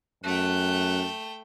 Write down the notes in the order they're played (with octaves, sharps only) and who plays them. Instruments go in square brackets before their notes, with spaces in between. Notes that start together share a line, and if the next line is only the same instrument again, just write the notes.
[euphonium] F#2 [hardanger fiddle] A3 G5 [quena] F#6